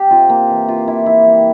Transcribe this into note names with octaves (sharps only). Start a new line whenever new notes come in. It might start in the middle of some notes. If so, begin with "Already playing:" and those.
Already playing: G4
C3 F4
A#3
E3
F4
E3 E4
E4
G3